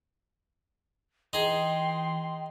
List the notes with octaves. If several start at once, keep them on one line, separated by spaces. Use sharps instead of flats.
E3 D#4 G#4 G5 C6